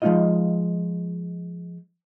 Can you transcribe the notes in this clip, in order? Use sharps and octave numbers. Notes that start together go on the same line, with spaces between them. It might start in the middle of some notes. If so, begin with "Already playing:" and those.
F3 G#3 A3 D#4 F4 D#5